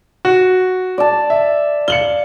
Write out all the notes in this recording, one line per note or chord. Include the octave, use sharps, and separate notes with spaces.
F#4
D5 A5
E5
F5 C#7 F#7 G7